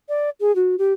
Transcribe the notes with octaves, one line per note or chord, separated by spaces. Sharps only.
D5
G#4
F#4
G4